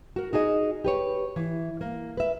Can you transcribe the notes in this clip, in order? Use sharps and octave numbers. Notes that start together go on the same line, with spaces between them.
F#4 A#4
D#4 F#4 G#4 D#5
G4 B4 C#5
E3
A#3
B4 E5